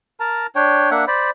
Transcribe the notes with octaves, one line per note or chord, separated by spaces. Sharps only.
A#4 A5 A#5
D4 C#5 G5
A#3 D4 E5 F#5
C5 D5 B5